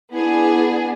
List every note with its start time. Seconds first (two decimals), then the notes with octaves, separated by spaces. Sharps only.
0.12 B3 D4 E4 G#4